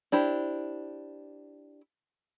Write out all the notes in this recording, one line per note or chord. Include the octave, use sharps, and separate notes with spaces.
D4 E4 G4 C5